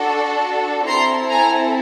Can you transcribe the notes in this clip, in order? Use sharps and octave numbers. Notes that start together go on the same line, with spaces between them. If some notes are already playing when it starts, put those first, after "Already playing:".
Already playing: D4 F#4 A4
C4 E4 A4 A#5 C6
G#5 A#5